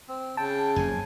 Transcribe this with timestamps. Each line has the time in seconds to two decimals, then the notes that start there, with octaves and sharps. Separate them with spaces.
0.08 C4
0.37 C#3 G5 A5
0.76 F#1 F2 C3 G#5